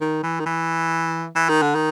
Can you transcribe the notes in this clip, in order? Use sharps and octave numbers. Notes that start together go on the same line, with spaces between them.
D#3
E3
D#3
E3
E3
D#3
D3
D#3